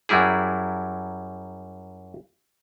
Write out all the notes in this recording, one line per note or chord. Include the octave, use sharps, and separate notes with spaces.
F#2 F#3 G3 E4 G#4